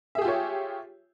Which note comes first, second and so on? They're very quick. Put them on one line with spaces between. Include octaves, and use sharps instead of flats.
E5 G#4 G4 F4 C#5